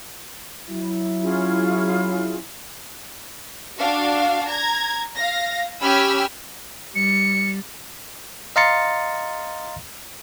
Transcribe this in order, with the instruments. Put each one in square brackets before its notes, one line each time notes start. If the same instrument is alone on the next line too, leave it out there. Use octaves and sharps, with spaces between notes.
[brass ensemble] F#3 E4
[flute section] C#4 F4 G#4
[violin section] D4 F#4 F5
A#5 G#6
F5 A#6
C#4 G4 G#5 B5 E6 F6
[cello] G3 [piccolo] C#7
[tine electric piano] D#5 F5 A#5 C6 A6 C#7